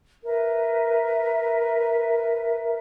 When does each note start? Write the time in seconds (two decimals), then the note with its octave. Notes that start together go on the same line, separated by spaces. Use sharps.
0.24 A#4 B4 E5